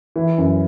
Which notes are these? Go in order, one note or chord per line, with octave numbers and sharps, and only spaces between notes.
E3
F#2